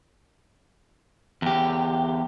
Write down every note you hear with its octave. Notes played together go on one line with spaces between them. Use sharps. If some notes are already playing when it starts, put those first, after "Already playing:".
E2 G4